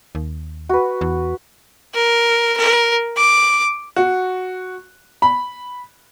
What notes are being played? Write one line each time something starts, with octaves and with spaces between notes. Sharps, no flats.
D#2
F#4 B4
E2
A#4
A#4
D6
F#4
B5